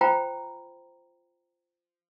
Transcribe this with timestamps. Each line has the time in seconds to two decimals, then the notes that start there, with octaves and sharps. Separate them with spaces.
0.01 F4 C5 G5 A#5 B5